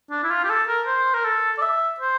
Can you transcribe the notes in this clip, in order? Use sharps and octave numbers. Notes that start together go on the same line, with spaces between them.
D4
E4
F4
G4
A4
A#4
C5
A#4
A4
D5
E5
C5